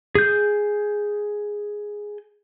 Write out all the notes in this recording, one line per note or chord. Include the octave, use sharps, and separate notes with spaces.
G#4 G6